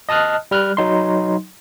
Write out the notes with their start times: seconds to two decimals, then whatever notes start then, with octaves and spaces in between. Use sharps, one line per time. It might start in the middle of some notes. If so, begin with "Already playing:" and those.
0.09 D#5 A5 D#6 F6 F#6
0.51 G3 F6 F#6
0.77 F#3 D#4 C6